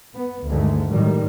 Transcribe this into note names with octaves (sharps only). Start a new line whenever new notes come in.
B3
D2 G2 D3 D#3 G#3 A3
F#2 A2 D#3 G3